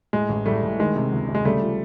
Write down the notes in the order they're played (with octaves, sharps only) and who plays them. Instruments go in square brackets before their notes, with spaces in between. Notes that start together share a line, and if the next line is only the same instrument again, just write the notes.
[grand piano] A2 G#3
A1
A2 G3 A3
A2
D#3 G#3
C3
C#2
C3
G#3
C#3 G3 A3
F3